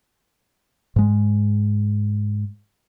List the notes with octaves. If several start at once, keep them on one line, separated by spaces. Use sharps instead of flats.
G#2 G#3